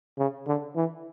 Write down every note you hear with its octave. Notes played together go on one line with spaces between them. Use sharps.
C#3
D3
E3